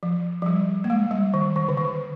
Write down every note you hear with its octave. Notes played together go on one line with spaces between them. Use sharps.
F3
F3
G3
A#3
G#3
G3
D#3
D#3
D3
D#3